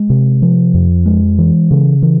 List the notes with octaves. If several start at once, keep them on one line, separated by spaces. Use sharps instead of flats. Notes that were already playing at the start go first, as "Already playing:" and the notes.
Already playing: G#3
C3
F3
F2
G#3
E3
C#3
E3